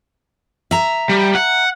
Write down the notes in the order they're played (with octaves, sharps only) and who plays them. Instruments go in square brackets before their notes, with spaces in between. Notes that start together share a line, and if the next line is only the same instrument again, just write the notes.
[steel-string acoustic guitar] E5 A#5
[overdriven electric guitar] G3
F#5